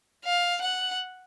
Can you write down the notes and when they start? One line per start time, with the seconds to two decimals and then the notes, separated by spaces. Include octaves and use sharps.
0.25 F5
0.61 F#5